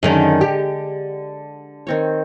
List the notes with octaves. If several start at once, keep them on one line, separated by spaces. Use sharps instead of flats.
F#2 D3 D#3 G#3 C#4
G4
D#3 C4 C#5